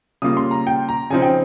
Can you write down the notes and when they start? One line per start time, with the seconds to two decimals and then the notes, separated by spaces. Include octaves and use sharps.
0.22 C#3 G3 A#3 F4 D#6
0.37 C6
0.51 A#5
0.67 G5
0.89 A#5
1.10 C#3 F3 C4 D#4 G#5
1.22 G5